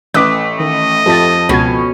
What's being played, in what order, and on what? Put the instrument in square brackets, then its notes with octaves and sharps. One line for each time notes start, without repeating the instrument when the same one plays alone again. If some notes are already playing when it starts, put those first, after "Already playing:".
[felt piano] A1 B4 B6 [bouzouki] A3 [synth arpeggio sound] D6 D#6 F#6
[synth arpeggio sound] D#3 [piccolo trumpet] D#5
[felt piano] F2 F3 [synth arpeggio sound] G4 A6
[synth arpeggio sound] C#2 F#4 G#6 [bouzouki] B2 C#4